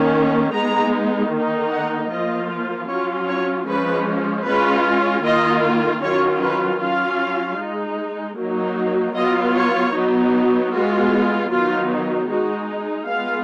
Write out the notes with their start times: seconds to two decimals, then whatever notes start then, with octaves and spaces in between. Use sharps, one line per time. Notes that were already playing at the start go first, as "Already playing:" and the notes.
Already playing: D#3 A#3 C#4
0.53 G#3 B3 D#4 A#5
1.31 D#3 A#3 D#4
1.70 F#5
2.09 F3 A#3 F4 D#5
2.88 F#3 C#4 F4 C#5
3.27 C#5
3.67 F3 G#3 C#4 B4
4.45 G#3 C#4 F4 B4
5.23 D#3 A#3 F4 D#5
6.01 D#3 F#3 C#4 F4 C#5
6.41 B4
6.80 F#3 C#4 F4 F5
7.59 G#3 D#4
8.37 F#3 A#3 D#4
9.15 F#3 B3 F4 D#5
9.54 C#5
9.94 F#3 B3 D#4
10.72 G#3 B3 F4 F#4
11.51 D#3 F#3 B3 D#4 F4
12.29 G#3 D#4 F#4
13.07 G#3 B3 F4 F5